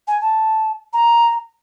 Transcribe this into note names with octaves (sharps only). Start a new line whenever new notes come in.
G#5
A5
A#5